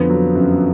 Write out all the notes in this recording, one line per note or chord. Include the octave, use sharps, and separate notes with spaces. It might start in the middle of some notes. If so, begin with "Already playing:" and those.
Already playing: F2 D3 F3 B3
F#3
F#2